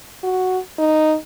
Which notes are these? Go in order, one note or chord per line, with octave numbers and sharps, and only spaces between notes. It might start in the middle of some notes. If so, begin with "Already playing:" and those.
F#4
D#4